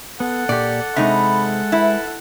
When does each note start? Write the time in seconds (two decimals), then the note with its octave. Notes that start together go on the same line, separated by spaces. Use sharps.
0.20 B3 A4 F#5
0.49 A#2 G4 D5
0.97 C3 G#3 D#4 E5 B5
1.72 E4 B4